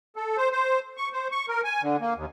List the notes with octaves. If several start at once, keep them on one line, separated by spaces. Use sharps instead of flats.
A4
C5
C5
C#6
C5
C#6
A#4
G#5
D3
A#3
D#2